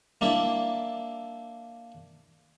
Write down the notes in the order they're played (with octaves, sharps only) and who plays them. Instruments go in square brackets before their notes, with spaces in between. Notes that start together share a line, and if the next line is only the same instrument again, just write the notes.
[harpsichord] A#3 D4 E4 E5